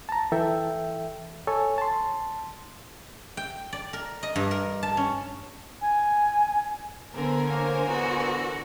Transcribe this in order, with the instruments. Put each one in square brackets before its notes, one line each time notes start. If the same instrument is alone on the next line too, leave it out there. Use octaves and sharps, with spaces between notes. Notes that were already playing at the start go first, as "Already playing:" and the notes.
[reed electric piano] A5 A#5
E3 A4 E5 G5
A4 C#5 G#5 C#6
A5 C6
[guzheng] G5
D5
A#4
D#5
G2
A#4
A5
C#4
[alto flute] G#5
[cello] D3 [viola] B3 [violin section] A#4 C5 G#5
[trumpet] A#3 [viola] C#5
[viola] D3 E3 [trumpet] B3 [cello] F#4